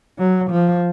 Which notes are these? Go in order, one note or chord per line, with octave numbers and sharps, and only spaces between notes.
F#3
F3